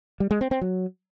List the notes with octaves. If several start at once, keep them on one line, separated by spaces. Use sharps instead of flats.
G3
G#3
C4
C4
F#3